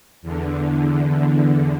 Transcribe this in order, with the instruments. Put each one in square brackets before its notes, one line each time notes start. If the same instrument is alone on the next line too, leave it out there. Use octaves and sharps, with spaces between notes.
[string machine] E2 D3